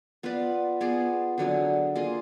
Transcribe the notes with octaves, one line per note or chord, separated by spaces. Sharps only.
B3 F4 B4 D5
B3 F4 G#4 D5
D3 F#3 D4 G#4
A#3 F4 G#4 D#5